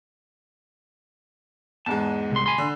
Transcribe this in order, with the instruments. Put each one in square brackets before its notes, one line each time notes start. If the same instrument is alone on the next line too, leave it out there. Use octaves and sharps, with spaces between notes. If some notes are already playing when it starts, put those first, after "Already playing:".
[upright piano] E2 G#2 G#3 [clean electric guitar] A5
[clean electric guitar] C2 C6
G#5 B5 C6
[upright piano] D3